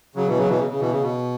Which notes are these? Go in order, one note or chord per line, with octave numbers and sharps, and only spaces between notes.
C#3 F#3
B2 E3
C#3 F#3
B2 E3
C#3
C#3
B2 E3
C#3
B2